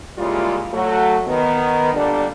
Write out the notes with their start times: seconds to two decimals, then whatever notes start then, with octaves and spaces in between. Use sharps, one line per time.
0.18 C#3 G3 G#3 A#3 E4 F4
0.72 F#3 A3 F#4
1.26 D#3 B3
1.94 A#2 D3 G3 D4